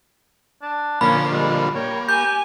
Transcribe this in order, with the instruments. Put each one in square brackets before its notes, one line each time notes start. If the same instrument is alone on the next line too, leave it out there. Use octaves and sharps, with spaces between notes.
[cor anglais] D4
[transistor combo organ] A#2 D3 F3 [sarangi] A#3 [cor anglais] C#4 [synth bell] B5
[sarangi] G3 [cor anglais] G#3
[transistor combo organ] A#3 [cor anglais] C#5 [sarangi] G5
[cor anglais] G4 [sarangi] G#5 [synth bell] G6